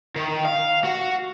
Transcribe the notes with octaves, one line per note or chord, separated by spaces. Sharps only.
D#3
F5
F#4